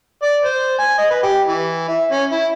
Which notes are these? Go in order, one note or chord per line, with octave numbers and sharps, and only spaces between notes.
D5
C5
G#5
D#5
B4
G4
E3
E5
C#4
E4